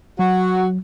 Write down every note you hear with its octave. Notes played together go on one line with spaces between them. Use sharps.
F#3 F#4